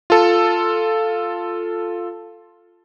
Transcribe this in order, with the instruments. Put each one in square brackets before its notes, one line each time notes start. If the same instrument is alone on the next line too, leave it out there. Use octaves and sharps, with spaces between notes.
[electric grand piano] F4 A4